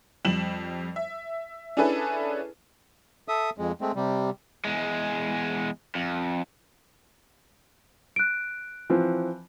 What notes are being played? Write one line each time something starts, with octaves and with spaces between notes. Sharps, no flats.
F2 G3 E7 F#7
E5
C#4 D4 E4 G#4 A4 B4
A4 E5 D#6
F2 G#3
G#3 A3 C4
C3 G3
E2 G#3
F2
F#6 D7
E3 F3 C4